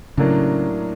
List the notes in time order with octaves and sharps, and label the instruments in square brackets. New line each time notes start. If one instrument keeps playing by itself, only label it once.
[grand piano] A2 F#3 A#3 D4 [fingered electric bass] C#3